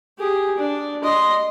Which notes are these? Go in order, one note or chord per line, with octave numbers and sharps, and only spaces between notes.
G4 G#4
D4
D#5 C6